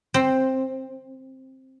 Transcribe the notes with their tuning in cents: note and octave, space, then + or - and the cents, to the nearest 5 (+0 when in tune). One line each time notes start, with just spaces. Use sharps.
C4 +10 C5 +0